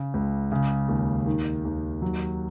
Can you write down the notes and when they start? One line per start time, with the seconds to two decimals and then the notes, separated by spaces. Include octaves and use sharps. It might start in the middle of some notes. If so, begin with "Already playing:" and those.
Already playing: C#3
0.14 C#2
0.52 C#3
0.88 D#2
1.26 D#3
1.65 D#2
2.02 F#3